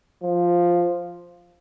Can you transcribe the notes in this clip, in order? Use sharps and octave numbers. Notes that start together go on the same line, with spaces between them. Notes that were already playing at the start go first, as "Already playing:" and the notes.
F3